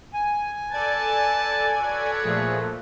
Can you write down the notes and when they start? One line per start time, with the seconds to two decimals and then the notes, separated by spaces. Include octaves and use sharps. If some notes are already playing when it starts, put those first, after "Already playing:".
0.14 G#5
0.71 A4 B4 D5 A5 G#6
1.80 F#4 B4 C#5
2.24 A#2 F3 A3 G#4